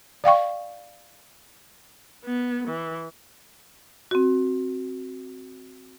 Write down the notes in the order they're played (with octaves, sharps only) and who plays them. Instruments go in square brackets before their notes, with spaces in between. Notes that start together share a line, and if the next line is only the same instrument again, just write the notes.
[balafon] D5 F5 G5 C#6
[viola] B3
E3
[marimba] C4 F#4